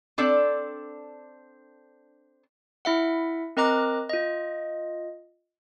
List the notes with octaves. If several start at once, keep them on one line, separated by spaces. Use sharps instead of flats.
C4 D4 A4 D5
E4 E5 F#5
C4 A#4 D#5 A#5 D6 F#6
F4 D#5